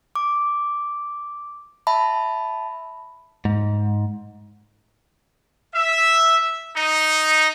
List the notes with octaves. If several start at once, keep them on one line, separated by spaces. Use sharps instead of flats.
D6
E5 A5 B5
G#2
E5
D#4